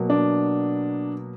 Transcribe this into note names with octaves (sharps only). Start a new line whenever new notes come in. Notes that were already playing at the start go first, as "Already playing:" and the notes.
Already playing: B2 F#3 A#3
D4